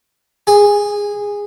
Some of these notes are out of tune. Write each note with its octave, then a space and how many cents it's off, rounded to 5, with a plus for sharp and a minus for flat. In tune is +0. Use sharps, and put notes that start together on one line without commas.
G#4 -15